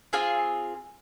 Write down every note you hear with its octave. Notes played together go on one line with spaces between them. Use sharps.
C4 F4 G#4 F5 G#5